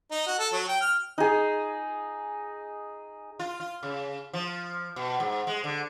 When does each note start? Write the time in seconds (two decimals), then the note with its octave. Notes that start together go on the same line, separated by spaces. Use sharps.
0.11 D#4
0.27 F#4
0.39 A4
0.53 F#3
0.68 G5
0.81 F6
1.18 D#4 G#4
3.39 F4
3.60 F4
3.83 C#3
4.33 F3
4.96 B2
5.20 G#2
5.47 G#3
5.64 D3